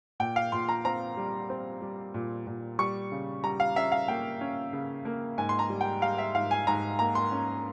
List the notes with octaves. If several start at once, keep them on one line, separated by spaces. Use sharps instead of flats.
A#2 G5
F5
A#2 C6
A#5
C4 A#5
G3
C4
G3
A#2
A#2
G3 C#6
C#3
G3 A#5
F5
C#4 E5
F5
A#3 G5
C#4
C#3
A#3
G#2 G#5
C6
A#5
G3
G5
G3 F5
E5
G#2 F5
G#5
G#2 A#5
A#3 A#5
C6
C#4